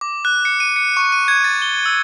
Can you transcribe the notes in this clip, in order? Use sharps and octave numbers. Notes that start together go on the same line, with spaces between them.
D6
F#6
C#7
D#7
C#7
C#6
D#7
G#6
A6
G7
E6